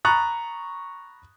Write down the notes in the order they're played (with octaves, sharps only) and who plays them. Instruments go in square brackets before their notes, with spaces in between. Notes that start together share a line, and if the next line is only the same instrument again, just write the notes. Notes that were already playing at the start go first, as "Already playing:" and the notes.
[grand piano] A#5 B5 C#6 D#6 F#6 A6